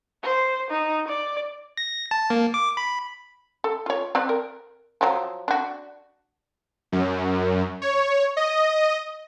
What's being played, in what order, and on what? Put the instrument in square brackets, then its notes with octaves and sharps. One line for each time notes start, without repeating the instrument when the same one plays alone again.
[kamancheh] C5
D#4
D5
[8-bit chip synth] A#6
A5
A#3
D6
B5
[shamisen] A4
F4 C#5
C4 B4 D5
A#4
F3 F#3
D4 F#4
[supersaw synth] F#2
C#5
D#5